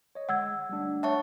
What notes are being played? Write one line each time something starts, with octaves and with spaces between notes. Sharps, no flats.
C#5 D#5
D3 G#3 F#5 E6 G#6
G3 A3 D4
C#5 E5 F#5 A5 C#6